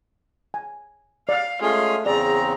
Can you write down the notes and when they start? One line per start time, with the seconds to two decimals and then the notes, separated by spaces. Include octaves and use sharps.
0.54 G#5
1.29 D5 F5
1.62 G#3 A3 C#4 F4 G#4
2.06 E2 C#3 C4 G#4 D5 A#5